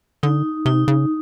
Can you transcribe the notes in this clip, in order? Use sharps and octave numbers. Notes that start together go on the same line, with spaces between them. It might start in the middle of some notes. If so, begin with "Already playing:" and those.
D3 D#4
C3 D#4
C#3